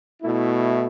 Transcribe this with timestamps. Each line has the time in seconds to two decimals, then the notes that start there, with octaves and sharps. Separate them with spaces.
0.23 B2 A3 E4